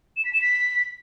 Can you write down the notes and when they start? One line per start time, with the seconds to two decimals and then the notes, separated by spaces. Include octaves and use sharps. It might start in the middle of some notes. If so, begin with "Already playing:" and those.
0.17 E7
0.25 B6
0.33 E7
0.41 B6